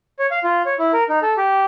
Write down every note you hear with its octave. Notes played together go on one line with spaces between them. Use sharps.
C#5
F5
F4
C#5
E4
A#4
D#4
A4
G4